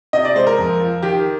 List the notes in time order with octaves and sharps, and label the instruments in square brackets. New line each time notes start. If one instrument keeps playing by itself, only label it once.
[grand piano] C3 [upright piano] D#5
[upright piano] D5
[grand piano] G#3 [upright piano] C5
[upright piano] A#4
[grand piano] F2
F3
[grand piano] D#3 [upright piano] G4